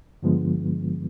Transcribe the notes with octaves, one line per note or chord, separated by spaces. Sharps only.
G2 D3 F3 G#3 B3